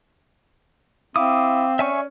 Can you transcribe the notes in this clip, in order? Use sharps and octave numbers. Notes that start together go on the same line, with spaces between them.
C4 E4 F5 D6 D#6
C#4 D5 E5 G#5 C#6